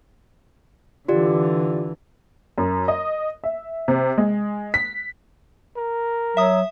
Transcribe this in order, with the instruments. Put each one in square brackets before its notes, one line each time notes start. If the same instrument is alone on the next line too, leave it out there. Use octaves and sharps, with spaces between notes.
[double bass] D3 E3 [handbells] F4 G4 D5
[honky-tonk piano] F#2
D#5
E5
C3
G#3
B6
[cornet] A#4
[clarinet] F#3 [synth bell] E5 D#6